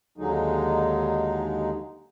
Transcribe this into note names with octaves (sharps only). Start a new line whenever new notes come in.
D#2 D3 F#3 G#3 D#4